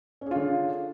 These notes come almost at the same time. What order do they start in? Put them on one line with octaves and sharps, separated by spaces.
C#4 G#4 F4 D3